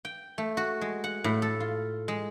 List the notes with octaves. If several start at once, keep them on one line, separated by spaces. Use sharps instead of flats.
G5
A3
F#4
G#3
F#5
A2
A4
F4
G#3